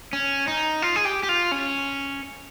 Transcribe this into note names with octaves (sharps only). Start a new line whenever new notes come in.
C#4
D#4
F4
G#4
G4
G4
F4
C#4